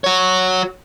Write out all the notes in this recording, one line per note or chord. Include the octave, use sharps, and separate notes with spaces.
F#4 C#5